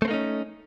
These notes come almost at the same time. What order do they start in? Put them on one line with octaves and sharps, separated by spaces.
A3 C4 A#3 D#4 C#4